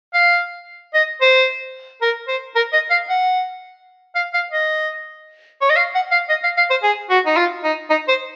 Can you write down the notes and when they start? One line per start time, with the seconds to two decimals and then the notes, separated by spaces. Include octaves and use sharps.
0.14 F5
0.94 D#5
1.21 C5
2.02 A#4
2.28 C5
2.56 A#4
2.73 D#5
2.90 F5
3.09 F#5
4.15 F5
4.34 F5
4.52 D#5
5.61 C#5
5.70 D#5
5.76 F5
5.95 F#5
6.11 F5
6.29 D#5
6.43 F5
6.57 F5
6.70 C5
6.83 G#4
7.10 F#4
7.26 D#4
7.36 F4
7.64 D#4
7.90 D#4
8.08 C5